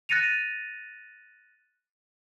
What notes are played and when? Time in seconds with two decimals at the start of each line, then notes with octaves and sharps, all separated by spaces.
0.09 F#6 A6 A#6 C#7 D#7 F7